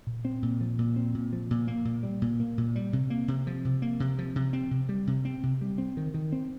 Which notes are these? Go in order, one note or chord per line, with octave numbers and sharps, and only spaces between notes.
A#2
C4
A#2
F3
A#2
C4
A#2
F3
A#2
A#3
A#2
G3
A#2
A#3
A#2
G3
C3
A#3
C3
F3
C3
A#3
C3
F3
C3
C4
C3
G3
C3
C4
C3
G3
C4
D#3
D#3
C4